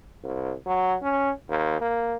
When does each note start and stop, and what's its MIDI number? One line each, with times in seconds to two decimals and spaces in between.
0.24 0.53 36
0.66 0.95 54
1.02 1.30 61
1.48 1.80 39
1.81 2.17 58